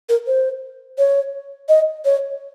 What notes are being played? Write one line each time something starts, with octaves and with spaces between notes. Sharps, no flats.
A#4
C5
C#5
D#5
C#5